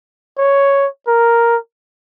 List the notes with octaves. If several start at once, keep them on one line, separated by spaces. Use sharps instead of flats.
C#5
A#4